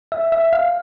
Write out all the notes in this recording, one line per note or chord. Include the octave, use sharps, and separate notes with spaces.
E5
E5
F5